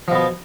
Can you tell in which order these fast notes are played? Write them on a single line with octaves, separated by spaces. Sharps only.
F3 B2 B3